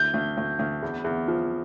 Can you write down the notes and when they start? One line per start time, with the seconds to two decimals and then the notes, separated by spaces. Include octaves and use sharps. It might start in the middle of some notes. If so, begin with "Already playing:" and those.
Already playing: D2 G6
0.14 D2
0.37 D2
0.59 D2
0.83 E2
1.04 E2
1.28 F3